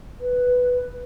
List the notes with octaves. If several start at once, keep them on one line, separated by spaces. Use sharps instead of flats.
B4